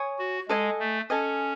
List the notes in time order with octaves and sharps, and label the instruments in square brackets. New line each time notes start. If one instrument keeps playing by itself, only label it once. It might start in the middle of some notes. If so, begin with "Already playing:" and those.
Already playing: [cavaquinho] C#5 G#5 D#6
[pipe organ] F#4
[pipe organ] G#3 [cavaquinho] A4 D#5 G#5
[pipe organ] A3
[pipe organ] C#4 [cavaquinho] A4 D#5 G#5